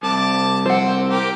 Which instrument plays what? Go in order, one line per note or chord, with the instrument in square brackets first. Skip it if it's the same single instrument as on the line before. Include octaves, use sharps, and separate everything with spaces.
[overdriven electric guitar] C2 [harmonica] A5 D6
[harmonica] C4 [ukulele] C5 F#5
[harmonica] G4 A#4